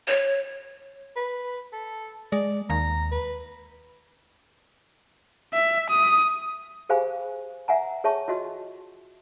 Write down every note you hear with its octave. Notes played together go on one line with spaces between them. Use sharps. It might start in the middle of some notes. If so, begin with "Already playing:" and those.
C#5
B4
A4
G#3 D5
D#2 A#5
B4
E5
D#6
G4 G#4 C5 F5 G#5 B5
E5 F#5 G#5 A#5
G#4 C#5 E5 A5 C#6
F4 F#4 D#5 C6